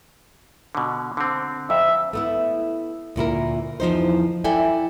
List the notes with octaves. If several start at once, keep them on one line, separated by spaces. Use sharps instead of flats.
B2 D3
D3 C4
F2 E5
A3 B3 E4
D2 A#2 E4 A#4
E2 F3 D#4 C5
E4 A4 D5 G5 G#5